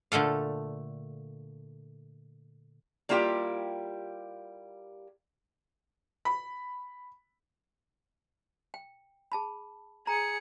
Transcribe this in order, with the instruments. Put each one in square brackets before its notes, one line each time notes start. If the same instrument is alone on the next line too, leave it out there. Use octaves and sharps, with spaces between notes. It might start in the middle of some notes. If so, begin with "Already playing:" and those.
[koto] A#2 D3 A3 A4 F5
[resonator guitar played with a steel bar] G3 A#3 E4 F4 G4 G5
[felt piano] B5
[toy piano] G5
G#4 A5 B5
[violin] G#4 C#7 [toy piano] A#5